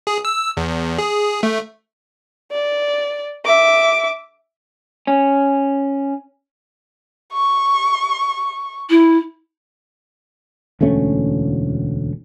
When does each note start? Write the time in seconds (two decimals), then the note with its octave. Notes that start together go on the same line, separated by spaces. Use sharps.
0.07 G#4
0.25 E6
0.57 E2
0.98 G#4
1.43 A3
2.52 D5
3.46 E5 D6
5.07 C#4
7.32 C#6
8.89 E4
10.81 E1 D2 A3 C#4